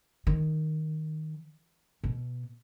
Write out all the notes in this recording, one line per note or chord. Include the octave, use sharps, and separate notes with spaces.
D#3
B2